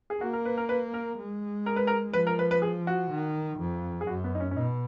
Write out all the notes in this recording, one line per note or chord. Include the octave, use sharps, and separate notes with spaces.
G#4
A#3 F#4
A#4
B4
A#4
B4
A#4
G#3
A#4
B4
A#4
F3 B4
A#4
B4
B4
G#4
F#4
D#3
F2
G#4
F#2 F#4
B3
D#4
C#4
C#4
B2 D#4